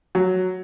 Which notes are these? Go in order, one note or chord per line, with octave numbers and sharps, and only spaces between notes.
F#3